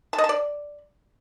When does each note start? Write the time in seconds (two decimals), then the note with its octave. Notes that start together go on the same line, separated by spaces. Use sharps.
0.13 A5
0.18 D#5
0.24 A5
0.29 D5